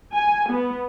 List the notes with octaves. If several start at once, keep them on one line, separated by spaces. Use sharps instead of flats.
G#5
B3